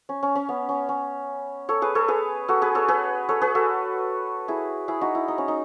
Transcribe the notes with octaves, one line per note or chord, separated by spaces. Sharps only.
C#4
C#4
C#4
B3
C#4
C#4
A4 C#5
G#4 B4
A4 C#5
G#4 B4
F#4 A4
G#4 B4
A4 C#5
G#4 B4
A4 C#5
G#4 B4
F#4 A4
E4 G#4
E4 G#4
D#4 F#4
E4
D#4
C#4
D#4